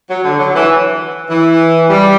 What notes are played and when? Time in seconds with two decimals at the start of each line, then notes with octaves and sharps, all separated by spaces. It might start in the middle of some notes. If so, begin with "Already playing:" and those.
0.09 F#3
0.24 D3
0.39 F#3
0.55 E3
1.29 E3
1.89 G3